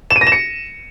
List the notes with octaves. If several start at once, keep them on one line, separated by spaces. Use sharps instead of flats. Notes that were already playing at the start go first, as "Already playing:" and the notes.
E7
D#7
A#6
E7
C#7